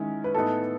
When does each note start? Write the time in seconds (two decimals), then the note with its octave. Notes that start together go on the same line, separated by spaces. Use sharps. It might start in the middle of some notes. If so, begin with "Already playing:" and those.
Already playing: D#3 G#3 C#4 E4
0.24 B4
0.35 A2 E3 B3 D#4 A4